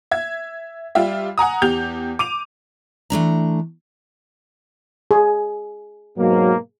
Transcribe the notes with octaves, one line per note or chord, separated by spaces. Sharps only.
E5 G#6
G3 F4 G4 E5
F#5 G#5 A#5 D#6
E2 G4 G6 F7
D6 D#7 F7
E3 A3 D4 A#5
G#4
G#2 B2 F#3 A#3